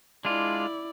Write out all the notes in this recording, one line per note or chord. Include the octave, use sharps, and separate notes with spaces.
G#3 D4 E4 F4 D5